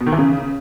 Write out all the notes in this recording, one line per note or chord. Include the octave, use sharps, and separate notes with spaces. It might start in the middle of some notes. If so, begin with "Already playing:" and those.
B2
D#3
E3
C#3